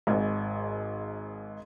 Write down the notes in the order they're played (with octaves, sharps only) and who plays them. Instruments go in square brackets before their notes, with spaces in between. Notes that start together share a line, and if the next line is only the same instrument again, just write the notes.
[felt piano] G#1 G#2